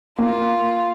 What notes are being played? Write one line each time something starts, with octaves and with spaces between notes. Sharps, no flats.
A#3 F4